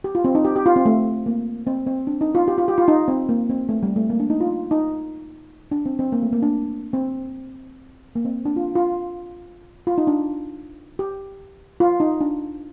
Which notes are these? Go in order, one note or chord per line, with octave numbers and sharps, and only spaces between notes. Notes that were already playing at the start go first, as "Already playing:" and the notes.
G4
F4
C4
D#4
G4
G4
F4
C4
A3
A#3
C4
C4
D4
D#4
F4
G4
F4
G4
F4
D#4
C4
A#3
C4
A3
G3
A3
A#3
D4
D#4
F4
D#4
D4
C4
C4
A#3
A3
A#3
D4
C4
A#3
C4
D4
F4
F4
F4
D#4
D4
G4
F4
D#4
D4